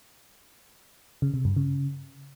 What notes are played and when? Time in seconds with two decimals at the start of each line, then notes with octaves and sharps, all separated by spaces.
1.22 C#3
1.34 C3
1.45 G2
1.56 C#3